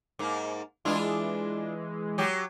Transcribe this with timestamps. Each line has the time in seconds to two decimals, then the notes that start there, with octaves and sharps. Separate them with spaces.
0.19 G#2 A#3
0.85 E3 G#3 D4 E4 F4
2.18 F#3 G4